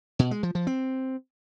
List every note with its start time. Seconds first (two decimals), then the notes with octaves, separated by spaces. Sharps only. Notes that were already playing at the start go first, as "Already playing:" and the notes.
0.19 B2
0.31 G#3
0.43 F3
0.55 F3
0.67 C4